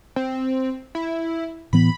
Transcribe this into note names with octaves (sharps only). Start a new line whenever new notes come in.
C4
E4
A2 E3 B3 B5